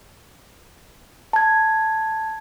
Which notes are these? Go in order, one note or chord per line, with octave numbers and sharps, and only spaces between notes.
A5 G#6